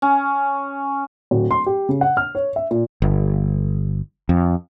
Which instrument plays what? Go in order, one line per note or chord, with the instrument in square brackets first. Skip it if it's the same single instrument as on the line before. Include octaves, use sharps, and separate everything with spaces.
[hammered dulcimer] C#4
[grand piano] D1
C6
G4
C#3
F#5
F6
C#5
E5
A#2
[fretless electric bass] G1
F2